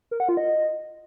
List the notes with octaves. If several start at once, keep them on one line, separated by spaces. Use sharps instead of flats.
A#4
F#5
F4
D#5